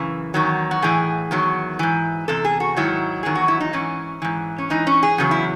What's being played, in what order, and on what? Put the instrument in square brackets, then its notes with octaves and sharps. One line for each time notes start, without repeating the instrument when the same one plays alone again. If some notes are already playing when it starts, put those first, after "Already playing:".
Already playing: [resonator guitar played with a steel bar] F#2 C#3 E3
E2 D#3 F#3
F#4
A2 E3 G#4
E2 D#3 F#3
G#2 E3
E2 C3 A4
G#4
F#4
G#2 D#3 F#3 E4
E2 D#3 F#3 G#4
F#4
E4
D#4
G#2 E3 C#4
G#2 E3
C#4
G#2 E3 D#4
C#4
G#4
E2 C#3 F#3 F#4
E4